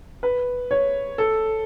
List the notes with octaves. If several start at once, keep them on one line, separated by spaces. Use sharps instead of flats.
B4
C#5
A4